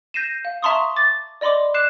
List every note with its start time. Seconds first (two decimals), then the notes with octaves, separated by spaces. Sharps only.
0.14 G6 A#6 C7 D#7 E7
0.45 F5
0.62 E5 A5 A#5 C6 C#6 D#6
0.96 D6 A6
1.41 D5 D#5 B5 C6 D6
1.74 D6 F#6 C7 E7